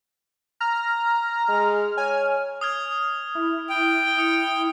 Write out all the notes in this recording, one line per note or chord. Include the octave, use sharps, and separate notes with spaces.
A#5 F6
G#3
C#5 G#5
D#6 F6 G#6
E4
G5
D#6 C#7